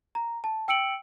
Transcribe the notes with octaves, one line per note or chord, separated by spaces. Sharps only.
A#5
A5
G5 E6 C#7 D7 F#7